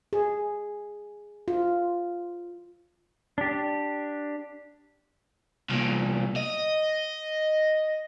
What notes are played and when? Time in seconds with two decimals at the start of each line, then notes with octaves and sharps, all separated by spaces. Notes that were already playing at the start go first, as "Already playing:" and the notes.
0.13 G#4
1.48 F4
3.38 D4 G4
5.70 C2 A#2
6.36 D#5